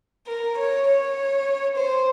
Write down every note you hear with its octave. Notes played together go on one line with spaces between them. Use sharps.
A#4
C#5
C#5
C5